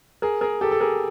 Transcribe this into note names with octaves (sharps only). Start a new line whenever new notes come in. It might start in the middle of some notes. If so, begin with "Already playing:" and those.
G#4 A#4
G#4 A#4
G4 A4
A4
G#4 A#4